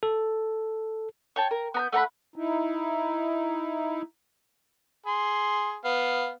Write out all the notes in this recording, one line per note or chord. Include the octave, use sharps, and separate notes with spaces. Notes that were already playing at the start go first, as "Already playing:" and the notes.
A4
C#5 G5 A5
A#4
B3 A#5 G6
A3 F#5 A#5 B5
D#4 E4
G#4 C6
B3 F5